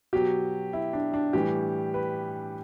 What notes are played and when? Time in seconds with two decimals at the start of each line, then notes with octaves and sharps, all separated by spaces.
0.13 B2 F#3 G4
0.73 E4
0.93 D4
1.14 D4
1.33 A2 E3 G3 G4
1.94 B4